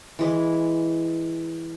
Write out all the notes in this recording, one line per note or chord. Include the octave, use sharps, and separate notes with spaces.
E3 G#3 D6